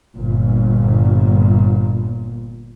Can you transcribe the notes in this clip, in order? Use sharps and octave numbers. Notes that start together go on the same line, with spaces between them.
G1 A#2